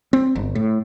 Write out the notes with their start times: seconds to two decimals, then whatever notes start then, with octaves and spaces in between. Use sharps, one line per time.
0.13 C4
0.35 G1
0.55 A2